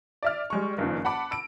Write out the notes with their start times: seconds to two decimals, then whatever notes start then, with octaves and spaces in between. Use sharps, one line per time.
0.23 D5 E5 F6
0.50 G3 G#3 C#6
0.78 F#1 G2 D#3 F3
1.05 F#5 A5 B5 D6
1.31 E6 D7